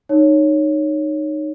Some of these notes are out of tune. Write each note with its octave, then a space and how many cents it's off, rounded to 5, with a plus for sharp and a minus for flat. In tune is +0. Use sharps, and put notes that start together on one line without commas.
D#4 -20 C#5 +0